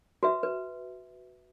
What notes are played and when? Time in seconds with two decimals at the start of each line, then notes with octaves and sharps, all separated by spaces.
0.23 F#4 B4 E5
0.43 B4